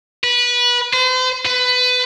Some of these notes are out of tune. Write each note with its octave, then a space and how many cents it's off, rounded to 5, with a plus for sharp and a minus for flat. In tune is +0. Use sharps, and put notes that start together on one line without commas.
B4 -20
C5 -40
B4 +20